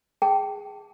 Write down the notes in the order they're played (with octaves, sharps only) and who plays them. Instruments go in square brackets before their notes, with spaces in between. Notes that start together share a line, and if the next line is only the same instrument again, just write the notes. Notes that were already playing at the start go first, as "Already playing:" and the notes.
[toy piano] G#4 G5 A5